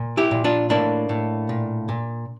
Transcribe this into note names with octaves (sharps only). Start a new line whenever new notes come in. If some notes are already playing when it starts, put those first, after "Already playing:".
Already playing: A#2
E4 G4
A#2
D4 F4
A2 A#3 D4
A2
A#2
A#2